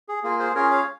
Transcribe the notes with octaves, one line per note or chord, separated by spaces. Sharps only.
G#4
A#3 F4 G#4
G#4 C5
C#4 F4 G#4 A#4 C#5
C#5 F5